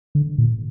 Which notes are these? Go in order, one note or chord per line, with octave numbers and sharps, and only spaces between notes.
D3
A#2